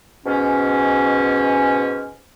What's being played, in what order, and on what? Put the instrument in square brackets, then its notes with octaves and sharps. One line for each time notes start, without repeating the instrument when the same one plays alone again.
[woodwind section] G#2 B2 C#4